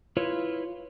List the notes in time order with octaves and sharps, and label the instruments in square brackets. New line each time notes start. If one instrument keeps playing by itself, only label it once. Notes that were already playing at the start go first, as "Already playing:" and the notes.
[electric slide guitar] E4 F4 B4 C#5